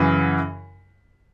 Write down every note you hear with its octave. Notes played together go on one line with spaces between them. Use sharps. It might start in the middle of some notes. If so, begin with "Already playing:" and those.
Already playing: F#2 C#3 E3